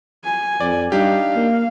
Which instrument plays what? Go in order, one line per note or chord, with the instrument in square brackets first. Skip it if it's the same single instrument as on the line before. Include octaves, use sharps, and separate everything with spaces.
[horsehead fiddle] G#5
[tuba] F2 [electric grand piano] D5
[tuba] G3 [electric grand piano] D4 D#4 G4 [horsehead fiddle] F5
[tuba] A#3